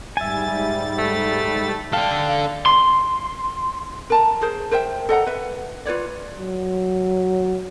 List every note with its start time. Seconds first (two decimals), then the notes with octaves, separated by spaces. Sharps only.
0.17 G#2 G3 E5 G#5 A6
0.98 A3
1.93 D4 A4 F5 G5
2.66 C6
4.10 A#4 A5 A#5
4.41 G#4 A#4 C5
4.71 A#4 C5 E5 G5
5.09 A4 D#5 F#5 A#5
5.27 B4 E5
5.85 F4 B4 C#5 D5
6.38 F#3